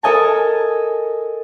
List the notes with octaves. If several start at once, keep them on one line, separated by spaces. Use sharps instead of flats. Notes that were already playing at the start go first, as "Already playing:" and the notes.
A4 A#4 D#5 G#5 A5